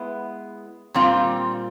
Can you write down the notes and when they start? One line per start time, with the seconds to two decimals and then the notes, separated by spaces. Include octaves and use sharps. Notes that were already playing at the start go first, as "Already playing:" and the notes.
Already playing: G#3 B3 E4
0.94 A#2 G3 C4 F4